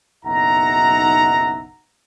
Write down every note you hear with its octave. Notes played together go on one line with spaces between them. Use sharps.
F#1 B1 D#4 E5 F#5 A#5